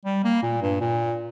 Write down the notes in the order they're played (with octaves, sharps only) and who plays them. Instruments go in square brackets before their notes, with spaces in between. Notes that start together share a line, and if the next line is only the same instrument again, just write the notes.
[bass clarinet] G3
A#3
A#2
G2
A#2